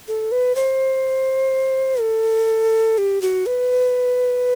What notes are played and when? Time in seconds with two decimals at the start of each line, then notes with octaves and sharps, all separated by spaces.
0.08 A4
0.32 B4
0.55 C5
2.01 A4
2.98 G4
3.22 F#4
3.46 B4